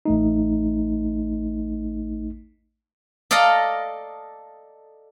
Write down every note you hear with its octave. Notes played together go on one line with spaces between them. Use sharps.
A1 A3 D#4
A4 D5 D#5 F5 A#5